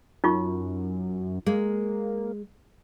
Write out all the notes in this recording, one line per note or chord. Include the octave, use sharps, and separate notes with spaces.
F#2 D#4 F4 C#6
G#3 A#3